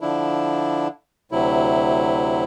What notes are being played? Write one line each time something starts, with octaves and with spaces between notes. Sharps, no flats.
D3 F3 D4 E4
D2 C3 F#3 E4